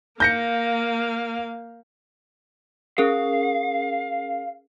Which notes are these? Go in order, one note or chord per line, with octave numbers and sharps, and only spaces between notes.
A#3 F5 G6 A#6 C#7
C#4 G#4 A#4 F5